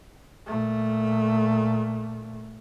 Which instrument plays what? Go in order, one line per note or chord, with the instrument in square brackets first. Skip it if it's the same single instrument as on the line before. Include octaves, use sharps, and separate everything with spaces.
[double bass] A#2 A3